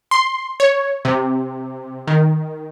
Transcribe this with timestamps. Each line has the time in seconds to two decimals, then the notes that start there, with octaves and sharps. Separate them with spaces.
0.11 C6
0.60 C#5
1.05 C3
2.07 D#3